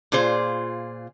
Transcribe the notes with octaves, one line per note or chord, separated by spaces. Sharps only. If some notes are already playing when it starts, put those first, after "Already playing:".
A#2 F4 G#4 C5